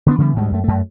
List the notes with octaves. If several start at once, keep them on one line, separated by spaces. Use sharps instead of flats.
D3 B3 D4
C#3 E3 G3 B3
D2 G#2 G3 G#3
F#2 A3
F#2 A3